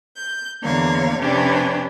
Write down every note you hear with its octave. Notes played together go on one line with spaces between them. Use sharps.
G6
E2 D3 A#3 C#5 F5
F2 C3 C#4 D4 G4 B4